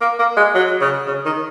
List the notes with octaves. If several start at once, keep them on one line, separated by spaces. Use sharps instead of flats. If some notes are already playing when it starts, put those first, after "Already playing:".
A#3
A#3
G#3
F#3
C#3
C#3
D#3